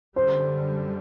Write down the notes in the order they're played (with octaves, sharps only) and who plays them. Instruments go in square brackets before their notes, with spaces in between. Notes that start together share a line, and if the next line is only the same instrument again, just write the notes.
[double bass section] F#2 D3 G3 [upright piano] C5